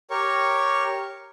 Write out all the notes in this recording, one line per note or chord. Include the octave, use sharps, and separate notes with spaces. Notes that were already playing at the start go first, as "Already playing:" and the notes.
G4 A#4 C#5 C#6